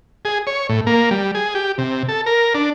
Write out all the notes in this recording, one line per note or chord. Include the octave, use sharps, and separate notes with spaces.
G#4
C#5
A2
A#3
G3
G#4
G4
C3
A4
A#4
D4